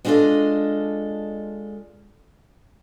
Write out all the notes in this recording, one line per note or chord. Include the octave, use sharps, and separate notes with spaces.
G#3 D4 F4 F#4 A4 D#5